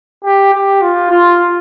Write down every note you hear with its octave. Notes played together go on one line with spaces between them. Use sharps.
G4
G4
F4
F4